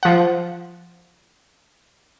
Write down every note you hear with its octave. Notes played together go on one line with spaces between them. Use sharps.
F3 F#5